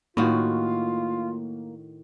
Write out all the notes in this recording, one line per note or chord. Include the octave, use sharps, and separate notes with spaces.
A2 D#3 A#3 F4 F#4